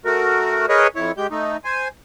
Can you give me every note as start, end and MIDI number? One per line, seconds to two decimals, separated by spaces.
0.05 0.66 57
0.05 0.66 66
0.05 0.66 70
0.69 0.87 68
0.69 0.87 70
0.69 0.87 71
0.69 0.87 73
0.69 0.87 75
0.96 1.12 41
0.96 1.12 64
0.96 1.12 73
1.17 1.27 56
1.17 1.27 67
1.17 1.27 91
1.31 1.57 57
1.31 1.57 63
1.64 1.88 72
1.64 1.88 80